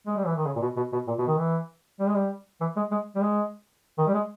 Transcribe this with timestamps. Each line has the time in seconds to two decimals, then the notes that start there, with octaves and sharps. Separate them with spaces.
0.07 G#3
0.16 G3
0.26 E3
0.36 D#3
0.46 C#3
0.56 A#2
0.62 B2
0.77 B2
0.92 B2
1.08 A#2
1.18 B2
1.28 D#3
1.38 E3
2.00 G3
2.07 G#3
2.15 G3
2.61 E3
2.76 G#3
2.91 G#3
3.15 G3
3.22 G#3
3.98 D#3
4.07 G3
4.14 G#3